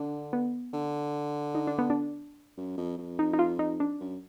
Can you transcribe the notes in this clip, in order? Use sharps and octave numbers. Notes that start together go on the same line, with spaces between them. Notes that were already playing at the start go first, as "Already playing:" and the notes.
Already playing: D3 D4
B3
D3
D#4
D4
B3
D4
F#2
F2
F2
D#4
D#4
F4
D#4
D4
F#2